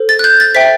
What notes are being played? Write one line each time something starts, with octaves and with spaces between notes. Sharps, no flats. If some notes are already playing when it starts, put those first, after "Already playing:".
Already playing: A4 C5
A6
F#6
G6
A6
C5 E5 G5 B6